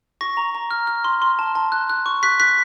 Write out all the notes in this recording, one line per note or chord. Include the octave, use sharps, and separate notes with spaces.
C#6 A#6
A#5
A#5
F6
F6
C6
C6
A5
A5
F#6
F#6
C#6
F#6 B6
F#6 B6